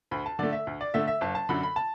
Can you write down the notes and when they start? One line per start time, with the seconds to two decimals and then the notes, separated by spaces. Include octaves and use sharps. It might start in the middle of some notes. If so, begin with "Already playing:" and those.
0.11 D2 B5
0.26 A5
0.39 D3 A3 D5
0.52 E5
0.67 D2
0.81 D5
0.94 D3 A3 E5
1.08 E5
1.21 F#1 A5
1.35 A5
1.49 F#2 D3 B5
1.63 B5
1.76 A5